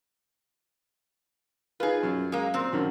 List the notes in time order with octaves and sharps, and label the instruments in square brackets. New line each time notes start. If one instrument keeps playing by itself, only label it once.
[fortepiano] D#4 B4 [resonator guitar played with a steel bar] F4 G#4
[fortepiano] F#2
[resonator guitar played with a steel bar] G#3 A#3
A#2 C4
[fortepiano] F#2 D3 D#3